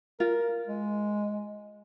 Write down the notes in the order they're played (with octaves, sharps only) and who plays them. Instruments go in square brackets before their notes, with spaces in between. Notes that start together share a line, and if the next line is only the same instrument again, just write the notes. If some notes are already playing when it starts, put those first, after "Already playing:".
[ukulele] F4 [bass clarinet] A#4
[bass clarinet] G#3